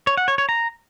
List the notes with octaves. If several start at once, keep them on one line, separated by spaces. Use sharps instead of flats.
C#5
F#5
C#5
C#5
A#5